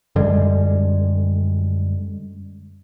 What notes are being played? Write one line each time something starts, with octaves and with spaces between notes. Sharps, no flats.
F#2 D3 G3 G#3